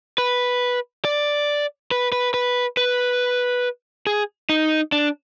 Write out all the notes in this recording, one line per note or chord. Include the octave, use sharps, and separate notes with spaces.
B4
D5
B4
B4
B4
B4
G#4
D#4
D4